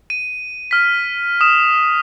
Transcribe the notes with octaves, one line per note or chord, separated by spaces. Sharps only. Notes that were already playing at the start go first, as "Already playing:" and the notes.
D#7
F6 B6
D#6 E7